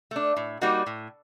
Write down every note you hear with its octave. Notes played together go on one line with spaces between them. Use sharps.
A3 D4
A2
G3 A#3 D#4 F#4
A2